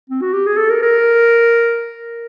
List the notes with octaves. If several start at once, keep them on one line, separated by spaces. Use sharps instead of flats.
C4
F#4
G4
G#4
A4
A#4
A#4